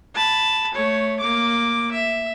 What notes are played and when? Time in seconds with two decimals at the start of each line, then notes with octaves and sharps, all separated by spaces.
0.15 A5 B5
0.73 A3 C#5
1.20 A#3 D6
1.92 E5